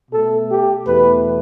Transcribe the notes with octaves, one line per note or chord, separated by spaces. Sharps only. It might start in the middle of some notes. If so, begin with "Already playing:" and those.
B2 A3 A4
G4
E2 B2 A3 B4